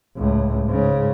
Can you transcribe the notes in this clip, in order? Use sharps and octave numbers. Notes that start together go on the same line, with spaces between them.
C#2 A2
G#2 C#3